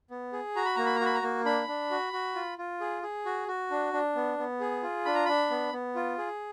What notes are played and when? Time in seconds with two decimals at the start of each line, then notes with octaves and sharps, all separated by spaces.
0.11 B3
0.33 G#4
0.56 F#4 A#5
0.65 B5
0.75 A#3 A#5
0.86 B5
0.95 A#5
1.01 F#4
1.06 B5
1.14 A#5
1.23 A#3
1.45 D4 B5
1.67 D4
1.91 F#4
2.13 F#4
2.35 F4
2.58 F4
2.81 G#4
3.03 G#4
3.26 F#4
3.48 F#4
3.71 D4
3.93 D4
4.15 B3
4.38 B3
4.60 G#4
4.83 F4
5.05 D4 B5
5.15 A#5
5.25 D4 B5
5.50 B3
5.73 B3
5.95 F4
6.18 G#4